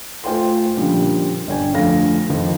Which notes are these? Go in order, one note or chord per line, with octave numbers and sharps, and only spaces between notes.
A3 F4 C5 G5 G#5 C6
A#2 D3 F3 G3 C#4
G1 D3 C#5 G5 G#5
F2 D3 F3 A3 F5 A#6
F2 D#3 F3